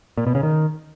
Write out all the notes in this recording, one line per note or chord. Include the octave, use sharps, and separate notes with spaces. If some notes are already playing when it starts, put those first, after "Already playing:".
A#2
B2
C#3
D#3